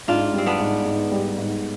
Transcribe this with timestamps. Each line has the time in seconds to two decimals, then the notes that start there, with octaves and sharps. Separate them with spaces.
0.08 G#2 D4 F4
0.33 G3 C4
0.46 B3 D4
0.59 G#2
0.85 G#2
1.12 G3
1.38 G#2